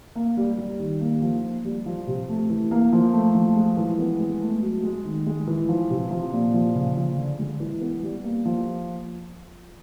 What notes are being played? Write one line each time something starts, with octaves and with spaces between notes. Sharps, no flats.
A#3
G3
G3
D#3
A#3
F3
A#3
G3
F3
C3
A3
E3
A#3
F3
A3
F3
G#3
E3
B3
G#3
A3
F#3
G#3
D#3
G#3
E3
F3
C3
F3
A#2
F3
C#3
F3
D3
G#3
E3
B3
G3
A#3
F3